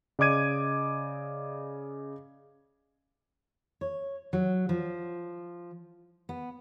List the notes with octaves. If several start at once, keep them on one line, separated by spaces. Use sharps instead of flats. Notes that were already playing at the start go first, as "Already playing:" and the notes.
C#3 D5 D#5 D6 G#6 D#7
C#5
F#3
F3
B3